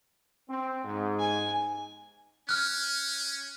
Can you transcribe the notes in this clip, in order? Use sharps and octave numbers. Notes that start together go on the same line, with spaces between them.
C4
G#2
G#5
C#4 F6 F#6